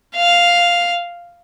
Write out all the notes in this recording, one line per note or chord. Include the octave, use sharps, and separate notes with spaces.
F5